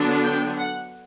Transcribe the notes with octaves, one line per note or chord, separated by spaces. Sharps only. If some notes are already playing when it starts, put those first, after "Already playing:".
Already playing: D3 F#3 B3 D4
G5
F#5